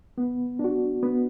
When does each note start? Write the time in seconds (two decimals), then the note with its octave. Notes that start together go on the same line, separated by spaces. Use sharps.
0.18 B3
0.59 D4 F#4
1.03 B3